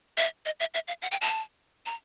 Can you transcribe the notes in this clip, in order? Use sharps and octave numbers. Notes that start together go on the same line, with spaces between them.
E5
D#5
E5
E5
F5
F#5
G5
A5
A#5